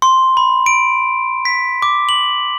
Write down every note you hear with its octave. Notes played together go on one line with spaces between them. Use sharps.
C6
B5
D7
B6
D6
F#7